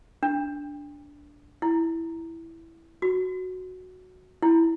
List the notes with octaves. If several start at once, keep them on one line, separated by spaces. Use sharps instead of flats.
D4
E4
F#4
E4